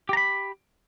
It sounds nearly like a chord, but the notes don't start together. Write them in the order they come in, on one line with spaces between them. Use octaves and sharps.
G4 A#5 B5